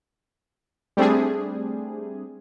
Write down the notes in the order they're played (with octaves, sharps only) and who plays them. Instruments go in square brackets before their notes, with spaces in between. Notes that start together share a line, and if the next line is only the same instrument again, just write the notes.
[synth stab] G3 A3 C4 D4 G#4